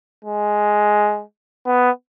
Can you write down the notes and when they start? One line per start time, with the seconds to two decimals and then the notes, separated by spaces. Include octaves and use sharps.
0.25 G#3
1.66 B3